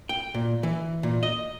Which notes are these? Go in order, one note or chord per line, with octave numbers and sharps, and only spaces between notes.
G5
A#2
E3
A#2
D#5